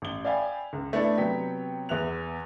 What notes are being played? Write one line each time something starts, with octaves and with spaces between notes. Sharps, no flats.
A1 G7
D5 E5 F5 G5 G#5 B5
C#2
A3 B3 D4 E4 A4
C3 F#3 B3 C#5 G5 B6
E2 B3 E5 F#6 F7